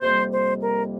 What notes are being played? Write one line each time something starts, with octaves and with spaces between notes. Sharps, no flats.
F2 C3 G3 A#3 C5
C5
A#4